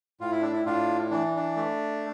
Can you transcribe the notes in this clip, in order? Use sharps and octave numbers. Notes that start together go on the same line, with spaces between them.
A2 F4
E4
D4
E4
A2 D4 F4
E3 D4
D4
A3